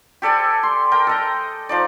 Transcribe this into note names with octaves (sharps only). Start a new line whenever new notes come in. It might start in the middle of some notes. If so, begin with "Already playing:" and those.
G4 A4 D5 G#5
C6
A#4 G5
A4 D#5
F3 D#4 D5